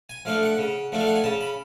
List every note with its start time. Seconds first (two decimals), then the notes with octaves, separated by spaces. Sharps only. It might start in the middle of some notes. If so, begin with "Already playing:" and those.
0.09 G#5
0.25 F3 A3 D4 F5
0.43 F#5
0.59 C#3
0.92 F3 A3 D4
0.99 F5
1.07 F#5
1.15 G#5
1.24 C#3 A5
1.41 B5